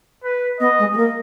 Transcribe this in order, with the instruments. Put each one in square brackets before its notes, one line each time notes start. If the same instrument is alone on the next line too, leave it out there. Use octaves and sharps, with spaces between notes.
[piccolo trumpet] B4
[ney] B3 [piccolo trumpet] D#5
[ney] G#3
G#3
A#3